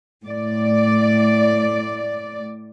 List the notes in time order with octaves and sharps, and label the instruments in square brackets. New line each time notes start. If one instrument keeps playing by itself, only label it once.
[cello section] A2 D5